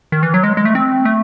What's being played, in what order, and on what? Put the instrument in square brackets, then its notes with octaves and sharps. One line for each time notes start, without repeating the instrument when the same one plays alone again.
[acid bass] D#3
E3
F#3
G#3
G#3
A3
C4
A3